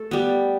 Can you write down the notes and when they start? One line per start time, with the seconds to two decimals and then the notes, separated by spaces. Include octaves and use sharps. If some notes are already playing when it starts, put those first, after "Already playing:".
Already playing: A3 A4
0.11 G3 B3